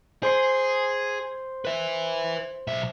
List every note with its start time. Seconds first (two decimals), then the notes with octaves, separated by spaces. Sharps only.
0.23 G#4 C5 C6 C7
1.65 B4 E5
2.68 B1 E5